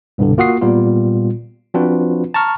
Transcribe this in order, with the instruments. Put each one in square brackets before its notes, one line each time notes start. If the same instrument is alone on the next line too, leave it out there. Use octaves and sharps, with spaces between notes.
[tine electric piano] C2 G2 B2 D3
A#3 F4 F#4 F#5 D#6 C7
A#2 G3 B3 F4
F3 C4 D4 F4 F#4 B4
A5 A#5 C#6 F6